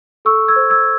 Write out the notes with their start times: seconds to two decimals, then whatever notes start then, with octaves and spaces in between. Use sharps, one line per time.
0.25 A4 C#6 E6
0.48 E6 G#6
0.56 C5
0.70 E6 G#6